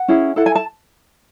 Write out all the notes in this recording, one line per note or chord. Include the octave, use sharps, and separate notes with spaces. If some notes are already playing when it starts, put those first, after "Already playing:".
Already playing: F#5
C#4 E4 G#4
E4 A4 F#5
G#5
A5